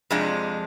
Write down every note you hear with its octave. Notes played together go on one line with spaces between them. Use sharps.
F2 C3 F3 G#3 D4